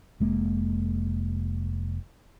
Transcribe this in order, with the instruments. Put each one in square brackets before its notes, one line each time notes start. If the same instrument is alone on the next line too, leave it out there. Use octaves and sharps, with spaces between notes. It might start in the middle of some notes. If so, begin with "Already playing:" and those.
[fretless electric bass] F1 G#3 A#3